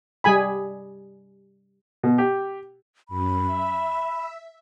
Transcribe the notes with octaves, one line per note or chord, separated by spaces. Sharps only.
G3 G#4 G#5 B5
B2
G4
F#2 B5
E5